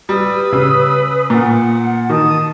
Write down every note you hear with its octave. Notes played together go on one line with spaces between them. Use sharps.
G3 B4 D#6 E6
C#3
A#2 F#5
D#3 A5 D#6